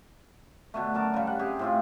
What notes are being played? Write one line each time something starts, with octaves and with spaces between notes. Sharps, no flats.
B2 D3 A3
F#2 A#4 A5 D6
C#3 G3
F#5
C3 G4 G#4
A2 C4 F4